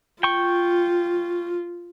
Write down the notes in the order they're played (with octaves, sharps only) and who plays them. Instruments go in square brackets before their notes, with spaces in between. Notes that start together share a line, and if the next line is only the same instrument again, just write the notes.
[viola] F4 [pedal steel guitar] G5 C#6